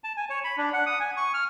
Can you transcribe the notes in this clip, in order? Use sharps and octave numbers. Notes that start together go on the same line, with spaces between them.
A5
G#5
C#5
B5
D4
F#5
D#6
G#5
C#6
F6